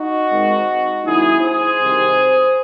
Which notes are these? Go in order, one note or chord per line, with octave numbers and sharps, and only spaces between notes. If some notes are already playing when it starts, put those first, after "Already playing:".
Already playing: D#4 F#4
G#2 D#3 G#3 C4
D#2 D#3 F#3 C#4 E4 G#4
G#4 C5
C2 C3 D#3